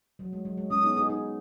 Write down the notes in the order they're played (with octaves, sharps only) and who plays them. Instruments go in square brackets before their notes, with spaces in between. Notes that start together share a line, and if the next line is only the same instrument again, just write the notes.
[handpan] F#3
G#3
F#3
G#3
[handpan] G#3 C#4 [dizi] D#6
[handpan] B3 D#4
D#4 G#4
D#4 G#4